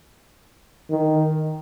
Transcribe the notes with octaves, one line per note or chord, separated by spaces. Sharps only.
D#3